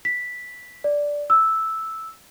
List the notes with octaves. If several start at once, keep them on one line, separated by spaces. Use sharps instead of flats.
B6
D5
E6